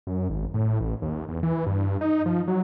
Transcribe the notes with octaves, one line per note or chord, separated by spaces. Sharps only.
F#2
G#1
A2
A1
D#2
E2
E3
G2
D#4
F3
F#3